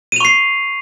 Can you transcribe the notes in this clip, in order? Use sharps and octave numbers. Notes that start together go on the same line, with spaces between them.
C#6 C7 D#7 F7